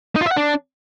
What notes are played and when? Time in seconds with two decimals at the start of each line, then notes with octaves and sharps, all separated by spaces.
0.16 D#4
0.21 F4
0.26 E5
0.31 F#5
0.37 D4